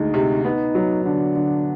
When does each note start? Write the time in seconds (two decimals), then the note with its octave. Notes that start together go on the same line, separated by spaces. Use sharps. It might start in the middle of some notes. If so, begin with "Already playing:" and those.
Already playing: D2 G#3 D#4
0.14 C3
0.45 B3 D#4
0.75 F#3
1.05 D3 D4
1.35 D3